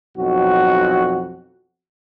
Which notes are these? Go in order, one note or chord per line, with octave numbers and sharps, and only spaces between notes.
B1 F2 F#4